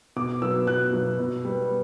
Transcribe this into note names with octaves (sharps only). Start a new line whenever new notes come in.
B2 D6
F#3 B3 E6
B2 F#6
F#3 B3
B2
G3 B3